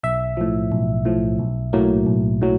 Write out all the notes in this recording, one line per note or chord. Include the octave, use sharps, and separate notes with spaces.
B1 E5
A2 F3
B1
A2 F3
B1
A2 F#3 A#3
B1
A2 F#3